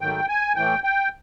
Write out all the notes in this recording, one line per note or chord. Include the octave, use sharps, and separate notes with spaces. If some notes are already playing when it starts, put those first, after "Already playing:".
G#2 D#3 F#3 A3 G5
G#5
A2 E3 A3 G5
G5